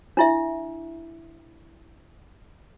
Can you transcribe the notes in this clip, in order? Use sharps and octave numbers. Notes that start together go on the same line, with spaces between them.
D4 E4 E5